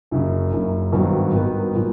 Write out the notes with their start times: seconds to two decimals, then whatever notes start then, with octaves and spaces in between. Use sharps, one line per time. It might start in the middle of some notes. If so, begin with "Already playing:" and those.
0.11 F#1 F#2 C#3
0.51 F#1 F#2 C#3
0.92 G#1 G2 D#3 F#3 B3
1.33 G#1 G2 D#3 F#3 B3
1.75 A#2 F#3